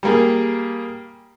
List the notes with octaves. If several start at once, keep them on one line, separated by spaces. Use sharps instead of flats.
G3 A#3 G#4